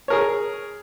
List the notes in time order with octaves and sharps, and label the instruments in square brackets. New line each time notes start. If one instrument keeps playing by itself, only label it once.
[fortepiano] G#4 A#4 C#5